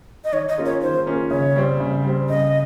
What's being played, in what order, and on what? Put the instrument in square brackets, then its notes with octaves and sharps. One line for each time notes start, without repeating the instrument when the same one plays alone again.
[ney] D#5
[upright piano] D#3 [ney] C#5
[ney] D#5
[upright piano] A#3 C#4 F4 G#4
[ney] C#5
[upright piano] D#3 [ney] C5
[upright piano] A#3 C#4 F4 G#4
[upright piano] C#3 [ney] C#5
[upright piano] G3 C4
C#3
G3 C4
[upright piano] C#3 [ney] D#5